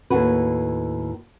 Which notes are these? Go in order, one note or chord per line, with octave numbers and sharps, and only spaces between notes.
D#2 A2 F#4 B4